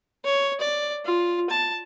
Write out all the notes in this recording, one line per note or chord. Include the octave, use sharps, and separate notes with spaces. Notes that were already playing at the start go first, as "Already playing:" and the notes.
C#5
D5
F4
A5